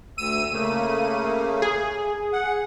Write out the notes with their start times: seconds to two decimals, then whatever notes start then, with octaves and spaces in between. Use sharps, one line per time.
0.18 D2 E6 D#7
0.53 C#3 A3 A#3
1.62 G#4
2.33 F#5